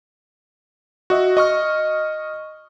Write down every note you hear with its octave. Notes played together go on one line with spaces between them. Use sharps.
F#4 D#5 E5
D#5 C#6 F6